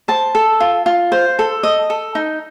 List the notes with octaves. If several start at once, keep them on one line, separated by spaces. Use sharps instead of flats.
C5 A5
A4
F4
F4
C5
A4
D#5
A4
D#4